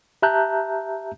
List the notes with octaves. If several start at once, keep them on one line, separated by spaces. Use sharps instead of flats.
G4 E5 A5 A#5 F#6 G6